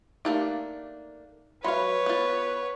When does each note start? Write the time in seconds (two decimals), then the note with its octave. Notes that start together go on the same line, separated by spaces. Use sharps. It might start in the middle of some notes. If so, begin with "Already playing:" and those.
0.25 A3 A#3 D4 D#4 G4 F5
1.64 F#3 B4 C#5 E5 F5 B5 C6
2.06 B3 F4